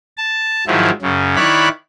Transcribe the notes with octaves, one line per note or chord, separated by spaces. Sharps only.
A5
G#2 D#3 F3 F#3 E4
F#2 C#3
D#3 E4 C#5 D5 B5 F#6